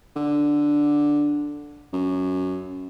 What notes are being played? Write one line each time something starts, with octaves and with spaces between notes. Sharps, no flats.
D3
F#2